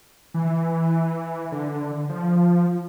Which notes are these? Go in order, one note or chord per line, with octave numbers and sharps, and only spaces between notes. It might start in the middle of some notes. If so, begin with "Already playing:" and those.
E3
D3
F3